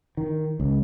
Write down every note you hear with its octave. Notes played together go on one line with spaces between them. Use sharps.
D#3
C#2